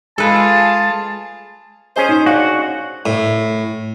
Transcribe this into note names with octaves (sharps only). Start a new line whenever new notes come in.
G#3 F4 G#4 A4 B4 A5
C#4 G#4 C5 D#5
D#4
D4 F#4 F5 F#5
A2